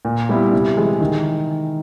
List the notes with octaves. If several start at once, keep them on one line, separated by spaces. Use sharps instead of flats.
A#2
G3 B3 E4
C3
E3 G#3
D#3